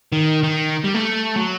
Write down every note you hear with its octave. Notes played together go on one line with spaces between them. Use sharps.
D#3
D#3
G3
A3
F#3